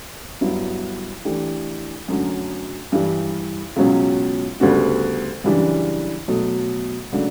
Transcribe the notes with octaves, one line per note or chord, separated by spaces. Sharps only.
G2 F#3 B3 E4
E3 A3 D4 G4
F#2 D3 F#3 A3
G2 E3 G3
C#2 B2 F#3 C#4
D2 C#3 G3 B3 F#4
F#2 C#3 E3 G3 D4
B2 F#3 A3
C#3 F#3 A3 D4